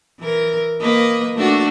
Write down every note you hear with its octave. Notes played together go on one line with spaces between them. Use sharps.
E3 A#4
A#3 B4 D#5
A3 D4 F#4